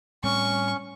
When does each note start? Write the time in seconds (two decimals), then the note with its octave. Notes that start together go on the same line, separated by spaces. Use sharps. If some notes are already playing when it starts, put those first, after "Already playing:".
0.24 A2 G3 C4 C#4 C#6